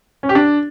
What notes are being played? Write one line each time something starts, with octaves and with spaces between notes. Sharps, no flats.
C#4
G4
D4